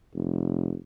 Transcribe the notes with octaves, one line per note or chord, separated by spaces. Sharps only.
F1